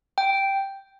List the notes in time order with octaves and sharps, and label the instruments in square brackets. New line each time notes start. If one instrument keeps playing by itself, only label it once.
[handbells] G5